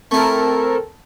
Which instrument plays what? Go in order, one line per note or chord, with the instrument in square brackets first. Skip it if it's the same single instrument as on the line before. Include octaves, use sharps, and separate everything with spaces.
[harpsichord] A3 E4 [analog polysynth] C4 A4 A#4